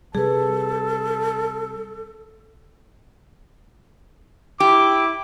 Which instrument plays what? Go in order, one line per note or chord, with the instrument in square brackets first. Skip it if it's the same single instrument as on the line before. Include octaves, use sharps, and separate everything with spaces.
[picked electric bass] C3 G3 [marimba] G#4 B4 [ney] A4 [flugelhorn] A5
[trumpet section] E4 D6 [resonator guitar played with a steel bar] G4